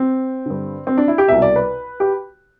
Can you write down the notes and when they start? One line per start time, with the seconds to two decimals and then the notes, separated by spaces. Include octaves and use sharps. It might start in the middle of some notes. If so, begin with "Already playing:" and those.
Already playing: C4
0.46 G2 D3
0.87 C4
0.98 D4
1.08 E4
1.18 G4
1.28 C2 B2 E5
1.42 D5
1.56 B4
2.00 G4